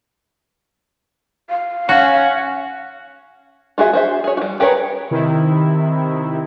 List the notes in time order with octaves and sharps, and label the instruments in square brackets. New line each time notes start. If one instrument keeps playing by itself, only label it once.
[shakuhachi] F5
[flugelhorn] C#4 [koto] F#4
[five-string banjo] F4 F#4 G#4 E5
F#4 C5 E5
G#4 C#5
G3 F#4
G4 G#4 A#4 B4 C#5
[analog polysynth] C3 D#3 E4